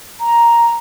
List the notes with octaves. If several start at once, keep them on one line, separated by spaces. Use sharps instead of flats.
A#5